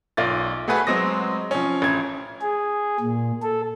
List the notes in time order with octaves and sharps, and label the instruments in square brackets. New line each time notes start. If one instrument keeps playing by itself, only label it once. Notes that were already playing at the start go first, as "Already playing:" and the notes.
[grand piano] B1 F4 D5 A6
A3 F#4 G#4 A4 B4
F#3 G#3 C4 D#6 A#6
F3 C#4
A1 G#6
[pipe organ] G#4
A#2
A4